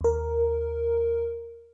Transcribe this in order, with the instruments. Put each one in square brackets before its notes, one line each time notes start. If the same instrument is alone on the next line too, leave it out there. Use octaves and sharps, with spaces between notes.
[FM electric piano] D#2 A#4